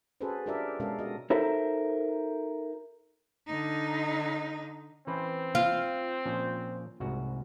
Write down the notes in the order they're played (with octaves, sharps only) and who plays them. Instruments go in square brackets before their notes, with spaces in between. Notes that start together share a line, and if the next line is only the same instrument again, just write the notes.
[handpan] C#4 F#4 G#4 A4 B4 C5
D4 F4 G4 A#4 D5 E5
B2 G#3 C#4 A4 A#4 F5
F#4 D#5
[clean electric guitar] D#4 F#4 A4 A#4 C5 E5
[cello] D3 D#4
[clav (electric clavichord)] E3 C#4 B4 [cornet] C4
[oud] F4
[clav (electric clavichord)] A#2 F3 C#4
C2 G#2 F#4